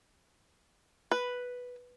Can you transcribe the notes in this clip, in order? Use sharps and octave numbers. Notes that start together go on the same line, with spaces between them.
B4